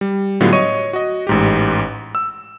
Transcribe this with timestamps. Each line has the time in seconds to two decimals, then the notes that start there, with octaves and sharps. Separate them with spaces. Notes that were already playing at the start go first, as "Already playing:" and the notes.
0.01 G3
0.40 A2 D3 F#3 G3 B3 F4
0.53 C#5 D#5 C#6 D#7
0.93 F#4 D#5
1.27 A1 G#2 G4
2.15 E6